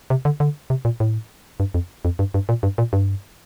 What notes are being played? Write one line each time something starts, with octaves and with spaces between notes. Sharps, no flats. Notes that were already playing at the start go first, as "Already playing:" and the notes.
C3
D3
D3
C3
A#2
A2
G2
F2
F2
G2
G2
A#2
G2
A#2
G2